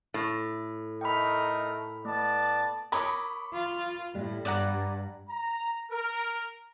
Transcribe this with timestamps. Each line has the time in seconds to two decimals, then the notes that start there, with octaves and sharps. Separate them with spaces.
0.14 A2
1.01 A3 D#4 A#4 G5 B5
2.05 A3 B3 D5 A5
2.92 A#4 C#5 B5 D6 D#6
3.53 F4
4.15 A2 G3
4.45 G2 D5 F#5 A#5
5.29 A#5
5.91 A#4